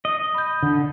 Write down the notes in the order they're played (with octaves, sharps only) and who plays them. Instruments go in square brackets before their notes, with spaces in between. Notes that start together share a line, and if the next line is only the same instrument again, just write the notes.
[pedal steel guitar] D#5
[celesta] B5 G6
[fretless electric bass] D3